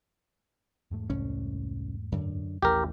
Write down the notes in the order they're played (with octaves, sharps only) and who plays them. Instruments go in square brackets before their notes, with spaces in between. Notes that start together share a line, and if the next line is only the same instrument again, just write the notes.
[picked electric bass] E2 G#2 A3
[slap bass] C2 C#4
F#2 D3
[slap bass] A1 [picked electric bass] D#2 [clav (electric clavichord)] G4 A#4